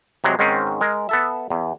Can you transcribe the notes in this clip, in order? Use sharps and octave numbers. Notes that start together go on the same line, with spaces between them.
C3 F#3 G#3
G#2 D#3 G#3 C4 C#4
G#3 A#4
B3 A4 E5
E2